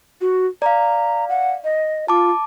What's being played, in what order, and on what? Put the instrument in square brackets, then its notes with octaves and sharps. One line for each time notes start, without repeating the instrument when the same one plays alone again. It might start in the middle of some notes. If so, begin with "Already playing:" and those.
[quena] F#4
[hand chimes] D5 F5 [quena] A#5
[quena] F#5
D#5
[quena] F4 [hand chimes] A5 D6